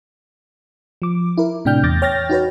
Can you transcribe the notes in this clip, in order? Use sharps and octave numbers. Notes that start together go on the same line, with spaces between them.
F3 D6
E4 A#4
A2 C3 D4 G5 F6 G6
E2 D6 G6 A6 A#6
C#5 G5 F6 G6 A6 A#6
D#4 F#4 B4 C#5